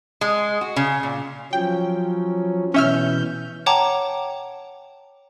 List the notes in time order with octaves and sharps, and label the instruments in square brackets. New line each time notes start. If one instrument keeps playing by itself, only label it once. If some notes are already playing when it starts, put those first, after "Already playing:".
[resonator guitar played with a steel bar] G#3
F#4
C#3
A#2
[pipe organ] F3 F#3 C#4 [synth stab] G5
[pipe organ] B2 E3 G6 [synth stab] C#4 E5 F6
[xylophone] C#5 F#5 G5 A5 A#5 D6